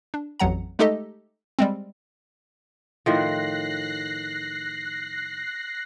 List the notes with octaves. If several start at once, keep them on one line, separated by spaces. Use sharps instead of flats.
D4
A1 F2 F#3 F#5 A#5
G#3 A3 D#4 G4 A4 D#5
G3 G#3 C4
A2 D#3 F3 F#6 A#6 C7